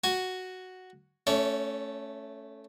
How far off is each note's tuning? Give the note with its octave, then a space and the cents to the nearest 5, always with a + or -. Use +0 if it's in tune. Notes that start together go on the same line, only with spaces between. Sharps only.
F#4 +0 G#5 +5
A3 +0 C#4 +0 C#5 +45